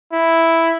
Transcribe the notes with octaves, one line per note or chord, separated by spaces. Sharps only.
E4